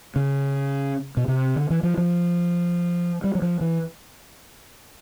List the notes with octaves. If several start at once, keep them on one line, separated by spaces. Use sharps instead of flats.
C#3
B2
C3
D3
E3
F3
F3
G3
F#3
F3
E3